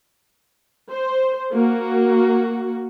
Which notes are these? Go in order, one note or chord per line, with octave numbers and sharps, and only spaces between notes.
C5
A#3 F#4